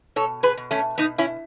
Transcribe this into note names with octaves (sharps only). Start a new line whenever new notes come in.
B2 A4 C#5
G#4 B4
B2
A3 C#4
B2 B3 D#4
C#4 E4